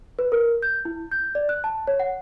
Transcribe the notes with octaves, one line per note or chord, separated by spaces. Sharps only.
B4
A#4
G6
E4
G6
D5
F#6
A5
C#5
F#5